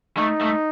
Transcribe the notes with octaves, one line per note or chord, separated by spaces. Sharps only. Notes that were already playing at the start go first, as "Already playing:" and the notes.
A3 D#4
A3